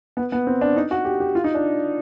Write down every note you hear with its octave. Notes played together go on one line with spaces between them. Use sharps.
B3
B3
C4
D4
D#4
F#4
G4
G4
F4
D#4
D4